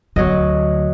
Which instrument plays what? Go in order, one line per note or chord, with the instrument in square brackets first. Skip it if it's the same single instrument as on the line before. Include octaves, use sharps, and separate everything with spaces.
[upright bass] D2 [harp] F#3 D#5